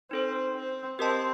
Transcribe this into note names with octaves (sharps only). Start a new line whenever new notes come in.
C4 D#4 A4 C5
C4
C4 G4 A#4 D#5 A5